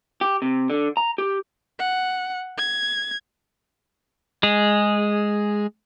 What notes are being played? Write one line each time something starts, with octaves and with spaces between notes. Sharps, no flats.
G4
C3
D3
A#5
G4
F#5
G#6
G#3 G#4